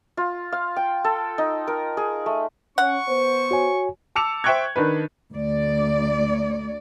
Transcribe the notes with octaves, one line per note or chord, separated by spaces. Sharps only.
F4
F5
G5
A4
D#4
A#4
G#4
A3
C#4 F#5 C#6
B3 C5
F#4 C#5 G#5
A5 D6 E6 C#7 F7
C5 E5 G5 C#6 F#6 G#6
D#3 D4 B4
D2 D5